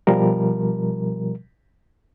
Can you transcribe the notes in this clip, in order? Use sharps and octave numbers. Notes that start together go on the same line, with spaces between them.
B2 F3 G3 A#4